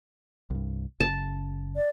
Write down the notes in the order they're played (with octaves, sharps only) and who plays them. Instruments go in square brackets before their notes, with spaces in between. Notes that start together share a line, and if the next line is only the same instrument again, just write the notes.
[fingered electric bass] C2 G2
[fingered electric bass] F#1 C#3 [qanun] A5
[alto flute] D5